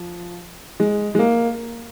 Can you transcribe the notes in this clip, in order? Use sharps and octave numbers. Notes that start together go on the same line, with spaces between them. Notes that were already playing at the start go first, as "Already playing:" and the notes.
Already playing: F3
G#3
G#3
A#3